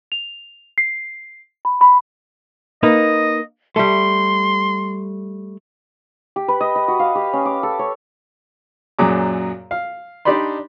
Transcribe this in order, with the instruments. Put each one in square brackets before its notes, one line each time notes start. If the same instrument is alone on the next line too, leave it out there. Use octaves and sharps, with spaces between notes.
[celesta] F7
C7
B5
B5
[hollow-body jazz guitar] A#3 D#4 B4 [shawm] D#5
[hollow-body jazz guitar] G3 A3 [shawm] C6
[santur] G4
B4
D#5
D#5
F#4
F5
G4
C#4
D6
A4
C#5
[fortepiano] F#2 A#2 F#3 G#4 D6
F5
D4 D#4 G4 D5 B5 C6